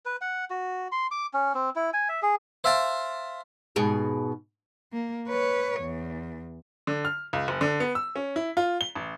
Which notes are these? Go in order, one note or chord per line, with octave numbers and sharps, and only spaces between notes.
B4
F#5
F#4
C6
D6
C#4
C4
E4
G#5
E5
G#4
C5 E5 F5 G5 A5
G#2 B2 G#4
A#3
B4 C#5
E2
D3
F6
C#2
F#1
D3
B3
E6
C#4
E4
F4
G7
A1